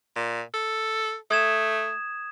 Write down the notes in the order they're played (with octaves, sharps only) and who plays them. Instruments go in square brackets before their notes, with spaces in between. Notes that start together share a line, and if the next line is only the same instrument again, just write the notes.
[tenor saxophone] A#2
A4
[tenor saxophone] A3 [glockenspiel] D#6 G#6 E7